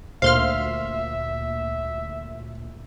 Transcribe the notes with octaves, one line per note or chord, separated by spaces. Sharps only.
D2 A#2 C5 E5 F5 C6 F6